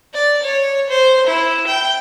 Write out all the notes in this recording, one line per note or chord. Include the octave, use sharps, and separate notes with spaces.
D5
C#5
C5
E4
G5